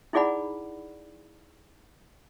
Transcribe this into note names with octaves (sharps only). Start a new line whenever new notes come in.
D#4 E4 G#4 D5 F#5 B5